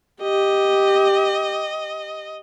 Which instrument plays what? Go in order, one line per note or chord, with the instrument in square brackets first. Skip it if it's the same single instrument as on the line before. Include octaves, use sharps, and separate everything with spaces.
[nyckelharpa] G4 [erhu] D#5